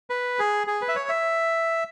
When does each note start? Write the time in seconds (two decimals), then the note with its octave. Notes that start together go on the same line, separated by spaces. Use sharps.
0.10 B4
0.39 G#4
0.67 G#4
0.82 B4
0.88 E5
0.96 C#5
1.09 E5